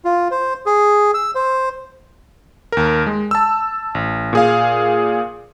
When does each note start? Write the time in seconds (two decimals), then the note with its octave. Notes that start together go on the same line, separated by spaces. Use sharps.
0.05 F4
0.31 C5
0.66 G#4
1.14 E6
1.35 C5
2.72 D#2 A#4
3.06 G#3
3.31 A5 E6
3.95 A1
4.33 A#2 G#4 F5